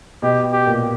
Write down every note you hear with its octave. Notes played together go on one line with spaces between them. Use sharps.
B2 G4
G4
A#2